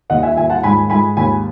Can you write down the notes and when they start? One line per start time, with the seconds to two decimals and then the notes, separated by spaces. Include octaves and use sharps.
0.10 D#2 D#5 F#5
0.23 E5 G#5
0.36 D#2 E5 G#5
0.50 F#5 A5
0.63 G#2 G#5 B5
0.90 G#2 G#5 B5
1.17 D#2 G#5 B5